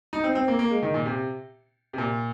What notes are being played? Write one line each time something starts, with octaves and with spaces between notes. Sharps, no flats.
D#4
C4
C4
A#3
A#3
G#3
D#3
A#2
C3
C3
A#2